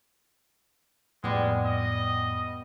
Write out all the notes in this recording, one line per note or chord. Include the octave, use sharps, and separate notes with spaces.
F2 A2 G3 G#3 B3
D#5